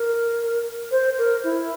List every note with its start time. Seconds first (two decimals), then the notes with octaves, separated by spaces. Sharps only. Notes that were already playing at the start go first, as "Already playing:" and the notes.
Already playing: A#4
0.91 C5
1.18 A#4
1.44 E4